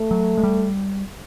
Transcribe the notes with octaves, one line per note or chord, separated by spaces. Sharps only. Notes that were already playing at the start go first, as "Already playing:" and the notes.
Already playing: A3
F#3
G#3
G3